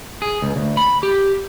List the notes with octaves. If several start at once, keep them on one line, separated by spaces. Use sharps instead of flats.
G#4
C#2
D2
B5
G4